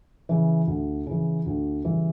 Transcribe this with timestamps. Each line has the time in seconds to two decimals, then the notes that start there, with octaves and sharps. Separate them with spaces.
0.29 C#3 E3
0.67 D2
1.07 C#3 E3
1.46 D2
1.85 C#3 E3 G3